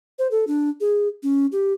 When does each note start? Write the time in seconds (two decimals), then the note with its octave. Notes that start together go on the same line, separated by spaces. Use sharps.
0.19 C5
0.31 A4
0.47 D4
0.81 G#4
1.23 C#4
1.52 G4